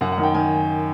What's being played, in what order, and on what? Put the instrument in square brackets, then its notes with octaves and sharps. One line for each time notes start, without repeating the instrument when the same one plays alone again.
[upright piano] F#2 F#5
F#5
D#3
G5
D#3 G#5